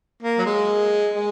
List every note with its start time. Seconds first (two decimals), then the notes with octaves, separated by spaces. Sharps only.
0.23 A#3
0.38 F#3
0.46 G#3
1.15 G#3